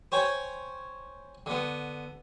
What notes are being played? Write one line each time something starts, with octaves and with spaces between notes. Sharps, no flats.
C5 C#5 G5 G#5 B5
D3 B3